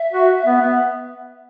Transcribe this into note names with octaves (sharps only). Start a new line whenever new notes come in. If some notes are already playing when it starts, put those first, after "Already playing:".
Already playing: E5
F#4
B3
B3